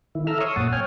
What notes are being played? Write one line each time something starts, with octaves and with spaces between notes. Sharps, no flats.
D#3 E4
A4 E5 A#5 E6 F6
C#5 C6 C#6 D#6 E6
F#2 A#2 F#5 A5 D#6
C#5 G5 G#5 F6